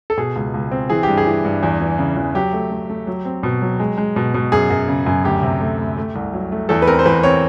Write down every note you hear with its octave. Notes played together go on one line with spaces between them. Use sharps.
A4
B2 G#4
C#2
C#2
C4
E3 G#4
G2 G4
G#4
E3
G2
E2
E3
C#3
E2
F#3 G4
A3
A3
A3
F#3
C4
B2
F#3
G#3
G#3
B2
B2
F#2 G#4
F#2
C#3
F#2
D2 G4
C3
A3
D2
A3
C2
F#3
A3
E2 A4
B4
C4 A#4
C5
E2 B4
C4 C#5